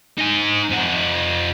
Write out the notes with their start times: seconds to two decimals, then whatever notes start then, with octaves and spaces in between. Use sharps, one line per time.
0.18 D#4 G#5
0.70 F2 F#5